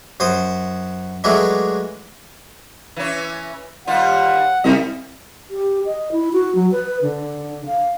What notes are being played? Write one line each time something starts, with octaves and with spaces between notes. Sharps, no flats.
F#2 C5 D#6
E3 F#3 G#3 A3 D4
E3 C#4
D#2 G3 F4 F#5
C2 C3 G3 D#5
G4
D#5
E4
F#4
F#3
B4
D3
F5